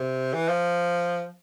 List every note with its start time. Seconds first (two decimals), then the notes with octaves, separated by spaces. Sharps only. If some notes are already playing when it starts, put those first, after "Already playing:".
Already playing: C3
0.34 E3
0.49 F3